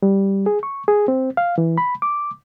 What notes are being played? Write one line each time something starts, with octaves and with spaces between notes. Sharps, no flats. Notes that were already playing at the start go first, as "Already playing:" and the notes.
G3
G#4
C#6
G#4
C4
F5
E3
B5
D6